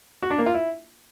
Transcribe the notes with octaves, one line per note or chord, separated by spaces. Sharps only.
F#4
D4
A#3
F4
E4